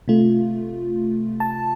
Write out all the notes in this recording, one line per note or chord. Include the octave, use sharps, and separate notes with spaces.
C3 A3 F4
A5